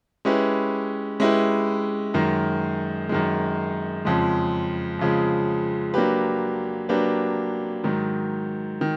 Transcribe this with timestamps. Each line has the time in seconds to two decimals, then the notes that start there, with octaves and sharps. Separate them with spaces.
0.25 G#3 C#4 E4 G4 B4
1.20 G#3 C#4 E4 G4 B4
2.14 F#2 D#3 G#3
3.09 F#2 D#3 G#3
4.05 F2 C#3 F3 G#3
4.99 F2 C#3 F3 G#3
5.94 F#3 A#3 D4 G4 B4
6.89 F#3 A#3 D4 G4 B4
7.84 G#2 D#3 F#3
8.81 D#3